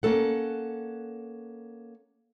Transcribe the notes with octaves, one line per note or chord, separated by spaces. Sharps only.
A#3 C#4 A4 F#5